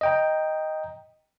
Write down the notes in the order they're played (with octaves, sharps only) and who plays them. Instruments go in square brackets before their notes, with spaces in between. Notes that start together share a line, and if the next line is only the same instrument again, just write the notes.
[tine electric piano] D#5 G5 A#5